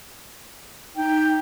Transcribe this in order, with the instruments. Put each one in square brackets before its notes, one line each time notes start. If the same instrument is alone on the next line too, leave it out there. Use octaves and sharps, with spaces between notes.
[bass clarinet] D#4 [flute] G5